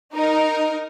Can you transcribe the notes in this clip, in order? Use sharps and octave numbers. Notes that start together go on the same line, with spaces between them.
D#4 A#4